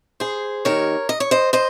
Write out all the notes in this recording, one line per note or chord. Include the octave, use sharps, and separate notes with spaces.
G#4 C5
D#2 D#3 A#4 C#5
D#5
C#5
C5 D#5
C5 D#5